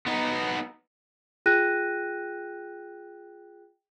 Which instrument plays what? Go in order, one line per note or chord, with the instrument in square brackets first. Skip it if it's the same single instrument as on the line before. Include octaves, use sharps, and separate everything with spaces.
[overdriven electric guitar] B3 D#4
[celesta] F4 G#4 G5 F#6 A#6 D#7